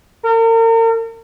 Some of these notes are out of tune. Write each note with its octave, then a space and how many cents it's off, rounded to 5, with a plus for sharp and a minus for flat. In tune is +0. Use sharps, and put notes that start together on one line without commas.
A#4 -40